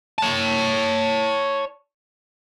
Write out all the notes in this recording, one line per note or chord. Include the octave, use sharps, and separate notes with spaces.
C#5 A5